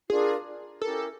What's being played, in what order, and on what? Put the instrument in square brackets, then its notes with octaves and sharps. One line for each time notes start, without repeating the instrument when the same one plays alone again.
[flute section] D4 F4 A#4 D5 [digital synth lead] G#4
[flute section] C#4 E4 G4 A#4 [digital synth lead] A4